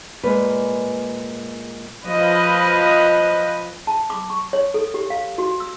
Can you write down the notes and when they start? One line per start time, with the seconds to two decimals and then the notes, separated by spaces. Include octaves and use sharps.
0.23 A#2 G#3 B4
2.07 F3 B4 D#5
3.87 A5
4.10 D6
4.30 C#6
4.53 C#5
4.74 A4
4.94 G4
5.10 F5
5.38 F#4
5.60 E6